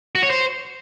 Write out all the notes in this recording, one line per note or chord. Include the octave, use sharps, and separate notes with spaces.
F#4
C#5
C5